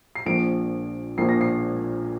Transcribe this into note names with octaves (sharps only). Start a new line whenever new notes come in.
C7
A#1 A#2 F3 D7
A#1 A#2 F3 C7
A#6
C7